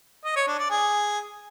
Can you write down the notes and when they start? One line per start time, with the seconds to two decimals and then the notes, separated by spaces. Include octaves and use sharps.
0.25 D#5
0.36 C#5
0.47 D4
0.59 D5
0.70 G#4